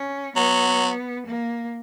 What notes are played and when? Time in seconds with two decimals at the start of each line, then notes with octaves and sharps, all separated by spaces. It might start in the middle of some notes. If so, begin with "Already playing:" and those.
Already playing: C#4
0.36 F#3 B3
1.27 A#3